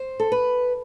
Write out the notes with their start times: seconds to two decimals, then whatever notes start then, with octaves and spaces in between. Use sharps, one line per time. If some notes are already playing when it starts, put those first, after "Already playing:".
Already playing: C5
0.20 A4
0.32 B4